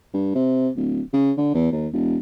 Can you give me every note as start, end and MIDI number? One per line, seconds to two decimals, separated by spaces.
0.14 0.32 43
0.35 0.69 48
0.76 1.01 26
1.13 1.32 49
1.37 1.53 50
1.54 1.69 40
1.72 1.87 39
1.93 2.17 28